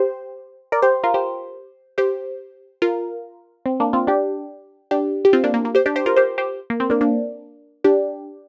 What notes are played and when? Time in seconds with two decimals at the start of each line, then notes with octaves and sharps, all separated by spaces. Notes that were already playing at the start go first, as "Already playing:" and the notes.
Already playing: G4 C5
0.72 A#4 D5
0.82 G4 C5
1.04 F4 A#4
1.14 G4 C5
1.98 G4 C5
2.82 F4 A#4
3.66 C4
3.80 A#3 D4
3.93 C4 F4
4.07 D4 G4
4.91 D4 G4
5.25 G4
5.33 C4 F4
5.44 A#3 D4
5.54 A#3
5.65 A#3
5.75 G4 C5
5.86 D4 G4
5.96 G4 C5
6.06 F4 A#4
6.16 G4 C5
6.38 G4 C5
6.70 A#3
6.80 C4
6.90 A#3 D4
7.01 A#3 D4
7.84 D4 G4